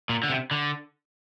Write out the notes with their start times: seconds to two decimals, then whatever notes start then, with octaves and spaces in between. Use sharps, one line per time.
0.09 A#2
0.23 D3
0.30 C3
0.51 D3